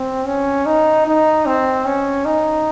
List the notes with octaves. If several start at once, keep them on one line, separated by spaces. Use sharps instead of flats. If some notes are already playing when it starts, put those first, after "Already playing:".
Already playing: C4
C#4
D#4
D#4
C4
C#4
D#4